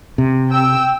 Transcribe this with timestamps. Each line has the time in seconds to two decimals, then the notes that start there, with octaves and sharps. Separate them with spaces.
0.18 C3
0.51 G5 E6